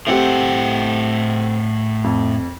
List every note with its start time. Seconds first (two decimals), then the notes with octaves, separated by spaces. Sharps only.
0.07 A2 A3 C4 G4 F#5
2.04 F2